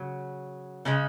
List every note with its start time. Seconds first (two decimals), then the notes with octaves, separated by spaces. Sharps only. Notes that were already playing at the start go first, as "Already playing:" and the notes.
Already playing: C#3 F#3
0.85 C#3 G#3 C#4